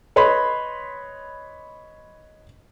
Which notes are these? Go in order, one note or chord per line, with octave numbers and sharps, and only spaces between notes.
B4 C#5 D#5 B5 C6